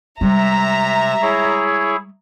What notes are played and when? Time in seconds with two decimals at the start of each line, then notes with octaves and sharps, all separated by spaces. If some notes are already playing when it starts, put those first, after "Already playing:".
0.21 C3 G3 G#3 E5 A#5
1.22 E4 G#4 C#5